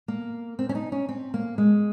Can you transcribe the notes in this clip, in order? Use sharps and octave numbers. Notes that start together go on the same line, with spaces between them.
A#3
C4
C#4
D#4
C#4
C4
A#3
G#3